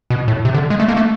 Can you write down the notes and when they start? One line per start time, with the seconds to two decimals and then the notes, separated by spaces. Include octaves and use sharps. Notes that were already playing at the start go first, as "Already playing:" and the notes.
0.10 B2
0.28 A2
0.45 C3
0.54 D3
0.70 G#3
0.80 A3
0.88 A#3
0.97 A3